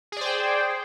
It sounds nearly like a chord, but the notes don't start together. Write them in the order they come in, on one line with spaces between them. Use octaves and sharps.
G#4 D5 C5 G5